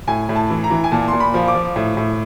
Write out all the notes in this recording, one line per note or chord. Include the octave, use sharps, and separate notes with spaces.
A2 G#5
A2
A5
E3
A#5
E3
G#5
A#2 A5
A#2 C6
B5
F3
D6
F3
A2
A2